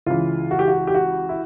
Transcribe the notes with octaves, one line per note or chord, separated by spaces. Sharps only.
C#2 C#3 E3 F4
F#4
G4
F#4
G4
F#4
E4